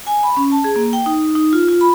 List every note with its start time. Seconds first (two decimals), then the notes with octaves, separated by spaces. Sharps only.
0.07 G#5
0.23 B5
0.37 C#4
0.52 A5
0.64 G#4
0.76 A#3
0.93 G5
1.06 D#4
1.35 D#4
1.53 F4
1.68 F4
1.81 B5